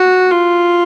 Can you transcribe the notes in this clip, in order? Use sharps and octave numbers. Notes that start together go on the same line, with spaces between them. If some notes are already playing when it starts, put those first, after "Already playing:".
Already playing: F#4
F4